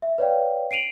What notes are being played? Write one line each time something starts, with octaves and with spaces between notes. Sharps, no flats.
E5
B4 C#5 D5 F5 G5
C7 D7 D#7 F7 F#7